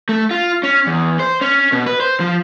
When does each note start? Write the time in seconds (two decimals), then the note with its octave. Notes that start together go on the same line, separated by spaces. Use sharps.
0.09 A3
0.31 F4
0.63 C#4
0.87 E2
1.20 C5
1.41 C#4
1.72 B2
1.86 B4
2.00 C5
2.20 F3